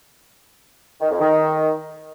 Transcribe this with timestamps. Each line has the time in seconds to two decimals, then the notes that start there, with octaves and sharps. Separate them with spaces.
1.01 D#3
1.10 F2
1.19 D#3